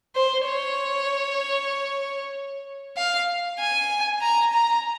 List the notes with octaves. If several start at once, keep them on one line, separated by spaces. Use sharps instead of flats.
C5
C#5
F5
G#5
A#5
A#5